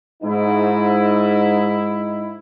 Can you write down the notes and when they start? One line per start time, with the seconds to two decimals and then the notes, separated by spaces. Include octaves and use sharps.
0.23 G#2 D#4 E4